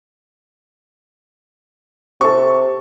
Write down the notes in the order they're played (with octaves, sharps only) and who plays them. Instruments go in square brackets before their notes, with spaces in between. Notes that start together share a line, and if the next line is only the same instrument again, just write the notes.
[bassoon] C3 [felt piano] A4 C#6